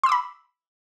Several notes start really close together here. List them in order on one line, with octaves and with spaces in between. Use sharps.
C6 E6 D6 B5